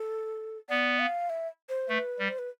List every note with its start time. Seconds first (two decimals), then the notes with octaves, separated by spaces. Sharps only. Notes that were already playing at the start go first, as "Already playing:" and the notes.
Already playing: A4
0.69 B3 D5
0.99 F5
1.30 E5
1.69 C5
1.89 A3 B4
2.19 G3
2.28 C5
2.39 B4